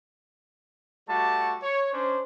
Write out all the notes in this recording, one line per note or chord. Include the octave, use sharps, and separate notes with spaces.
G3 A3 F#4 A5 D6
C#5
C#4 D4 C5